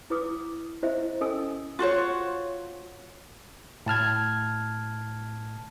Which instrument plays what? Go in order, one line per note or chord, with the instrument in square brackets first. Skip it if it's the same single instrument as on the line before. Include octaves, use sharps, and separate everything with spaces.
[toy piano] E4 B4 D6 D#6
E4 C5 D#5 E5
C#4 A4 D#5 G#5 D#6 E6
[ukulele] F4 F#4 C5 C#5
[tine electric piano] A2 A5 F6 G#6